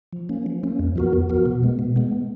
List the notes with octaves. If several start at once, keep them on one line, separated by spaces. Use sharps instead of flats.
F3
A#3 C#4
F3
A#3 C#4
F2
F3 B3 F#4 A#4
F2
F3 B3 F#4 A#4
B2
G#3 B3
B2
G#3 B3